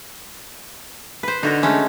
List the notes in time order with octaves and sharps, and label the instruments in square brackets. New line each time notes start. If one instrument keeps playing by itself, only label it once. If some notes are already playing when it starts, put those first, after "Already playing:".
[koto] B4 C5
[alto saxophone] D3 [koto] D#4 F#4 A#4
[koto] G#3 A3 C#4